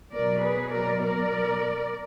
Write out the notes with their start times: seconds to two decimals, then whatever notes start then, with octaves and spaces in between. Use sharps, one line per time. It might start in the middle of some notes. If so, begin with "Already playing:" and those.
0.13 B2 F#3 B3 A#4 D5
0.42 G#4 B4
0.71 A#4 D5
1.01 A#4 D5